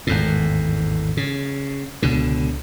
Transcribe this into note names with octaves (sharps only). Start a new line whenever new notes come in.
G#1 E2 A2
C#3
C#2 B2 D3